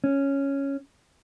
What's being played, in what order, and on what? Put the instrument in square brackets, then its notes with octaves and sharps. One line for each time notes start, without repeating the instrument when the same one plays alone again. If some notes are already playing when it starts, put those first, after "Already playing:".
[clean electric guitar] C#4